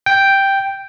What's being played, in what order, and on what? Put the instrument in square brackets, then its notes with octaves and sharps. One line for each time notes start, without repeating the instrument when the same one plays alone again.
[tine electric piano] G5